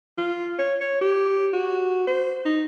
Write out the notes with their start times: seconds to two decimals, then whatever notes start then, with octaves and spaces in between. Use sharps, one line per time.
0.17 F4
0.59 C#5
0.80 C#5
1.01 G4
1.53 F#4
2.07 C5
2.45 D#4